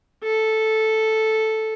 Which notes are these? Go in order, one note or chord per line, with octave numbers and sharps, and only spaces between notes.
A4